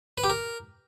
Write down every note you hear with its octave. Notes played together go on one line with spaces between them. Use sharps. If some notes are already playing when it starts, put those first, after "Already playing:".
B4
G4
A#4